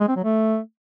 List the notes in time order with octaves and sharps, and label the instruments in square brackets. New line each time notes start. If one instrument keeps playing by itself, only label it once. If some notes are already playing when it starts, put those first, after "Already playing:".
[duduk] G#3
C4
F#3
A3